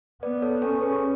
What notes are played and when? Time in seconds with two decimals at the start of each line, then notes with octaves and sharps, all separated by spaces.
0.23 B3 B4 D5
0.42 A4 C#5
0.62 C#4 A4 C#5
0.81 G#4 B4